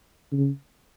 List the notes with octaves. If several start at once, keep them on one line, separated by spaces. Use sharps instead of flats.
C#3